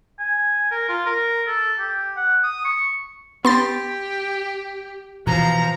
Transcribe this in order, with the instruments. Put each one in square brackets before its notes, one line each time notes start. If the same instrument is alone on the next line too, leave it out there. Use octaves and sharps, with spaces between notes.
[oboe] G#5
A#4
F4
A#4
A4
G4
F#5
D#6
C#6
[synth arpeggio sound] B3 C6 A6 [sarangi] G4
[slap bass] B2 E3 [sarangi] F3 [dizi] A#5